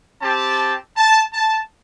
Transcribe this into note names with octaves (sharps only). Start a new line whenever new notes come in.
C4 G4 A5
A5
A5